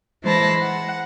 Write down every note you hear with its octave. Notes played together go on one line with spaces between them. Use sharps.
E3 G#3 C5 A5 B5 A#6
F#5